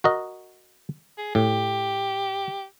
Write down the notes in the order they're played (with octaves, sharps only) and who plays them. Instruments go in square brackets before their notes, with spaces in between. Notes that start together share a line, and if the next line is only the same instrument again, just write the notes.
[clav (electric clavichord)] F#4 A#4 D#5
[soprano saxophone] G#4
[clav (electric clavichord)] A2 [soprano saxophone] G4